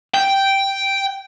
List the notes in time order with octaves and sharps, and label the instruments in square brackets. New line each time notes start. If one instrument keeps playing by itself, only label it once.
[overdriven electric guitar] G5